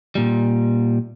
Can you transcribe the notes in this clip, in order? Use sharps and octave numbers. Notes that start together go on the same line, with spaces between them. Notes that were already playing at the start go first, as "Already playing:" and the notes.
A#2 G3